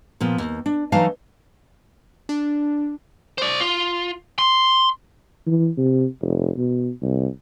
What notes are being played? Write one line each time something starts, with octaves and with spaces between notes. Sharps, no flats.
A#2 F3 B3
D#2
D4
E3 F#3 A3 D#4 F5 A5
D4
C5 D5
F4
C6
E3
C3
F1
B2
C2